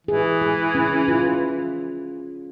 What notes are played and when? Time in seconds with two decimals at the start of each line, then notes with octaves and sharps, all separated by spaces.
0.07 E3 G#4
0.42 G#4
0.75 C#4
1.08 F4